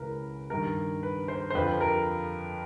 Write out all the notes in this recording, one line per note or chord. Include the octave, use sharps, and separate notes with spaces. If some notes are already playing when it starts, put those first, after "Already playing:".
Already playing: C#2 C#3 E3 A#4 B4
G2 D#3 A#4
B4
C5
C5
F2 D3 F3 B4
A#4